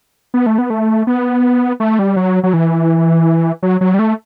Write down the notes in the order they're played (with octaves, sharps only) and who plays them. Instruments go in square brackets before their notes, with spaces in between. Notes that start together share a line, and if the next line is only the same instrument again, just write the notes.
[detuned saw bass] B3
A3
B3
A3
B3
A3
G3
F#3
F#3
E3
F#3
F#3
G3
A3